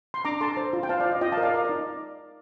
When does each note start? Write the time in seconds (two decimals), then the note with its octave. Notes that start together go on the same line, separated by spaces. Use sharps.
0.14 C6
0.25 D4 A#5 D6
0.41 A4 A5 C6
0.57 C5
0.73 F4
0.83 G5
0.89 C5 F5 A5
1.00 D5 F5
1.06 F4
1.11 D#5
1.21 F4 D#5 G5
1.32 F5 A5
1.37 A#4
1.43 D5 F5
1.54 A#4 D#5
1.65 D5
1.69 D#4